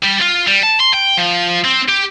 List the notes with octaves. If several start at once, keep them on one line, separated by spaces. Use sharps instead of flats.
G3
F4
G3
A5
C6
G5
F3
C4
G4